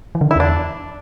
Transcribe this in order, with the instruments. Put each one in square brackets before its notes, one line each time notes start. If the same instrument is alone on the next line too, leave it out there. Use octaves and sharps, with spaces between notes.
[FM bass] E3
D3
[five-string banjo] E4
[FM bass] E2 [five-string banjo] D4